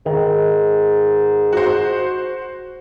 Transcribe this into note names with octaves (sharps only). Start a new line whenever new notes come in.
G#2 D#3
F#4 C5